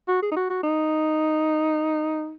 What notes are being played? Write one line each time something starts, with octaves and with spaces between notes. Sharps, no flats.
F#4
G#4
D#4
F#4
F#4
D#4